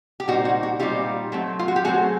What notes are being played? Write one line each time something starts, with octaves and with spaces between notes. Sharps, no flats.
G4
A#2 G3 C4 D#4 F#4
F#4
F#4
A#2 G3 C4 D#4 F4 G4
F#3 A3 C4
F4
F#4
G4
F#3 A3 C4 F#4 G#4